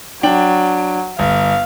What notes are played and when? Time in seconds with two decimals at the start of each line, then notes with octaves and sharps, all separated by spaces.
0.23 F#3 D4 G5 F#7
1.19 G1 F5